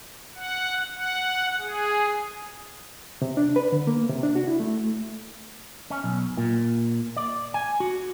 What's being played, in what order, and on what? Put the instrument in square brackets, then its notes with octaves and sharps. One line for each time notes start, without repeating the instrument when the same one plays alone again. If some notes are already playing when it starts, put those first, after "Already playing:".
[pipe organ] F#5
F#5
G#4
[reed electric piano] C3
D4
B4
D3
A#3
C3
D4
F#4
E4
A3
[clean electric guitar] C#4
B1
A#2
D5
G#5
F#4